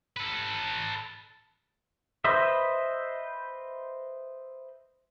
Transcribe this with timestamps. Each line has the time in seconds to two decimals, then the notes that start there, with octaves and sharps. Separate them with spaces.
0.17 A4 B4
2.24 B4 C5 D#5 E5